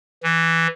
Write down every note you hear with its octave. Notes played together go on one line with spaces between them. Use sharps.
E3